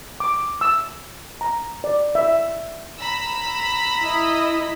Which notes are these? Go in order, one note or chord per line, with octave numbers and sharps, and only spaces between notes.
D6
E6
A#5
D5
E5
A#5 B5 E6
E4 D#5